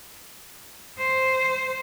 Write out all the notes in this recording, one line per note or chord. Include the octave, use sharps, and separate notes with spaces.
C5